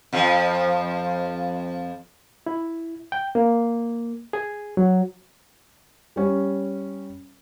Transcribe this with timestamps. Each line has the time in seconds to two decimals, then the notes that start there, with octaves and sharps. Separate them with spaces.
0.13 F2 F3
2.46 E4
3.12 G5
3.35 A#3
4.33 G#4
4.77 F#3
6.16 G3 C#4